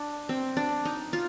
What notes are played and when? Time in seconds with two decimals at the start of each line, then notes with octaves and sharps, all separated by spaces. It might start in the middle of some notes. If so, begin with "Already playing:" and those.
Already playing: D4
0.29 C4
0.57 D4
0.85 D#4
1.13 F4